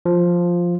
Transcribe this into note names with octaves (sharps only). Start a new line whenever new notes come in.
F3